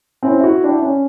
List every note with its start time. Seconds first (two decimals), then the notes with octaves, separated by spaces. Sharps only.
0.23 C4 C#4 E4
0.41 E4 F#4
0.64 D4 E4 G5
0.82 C#4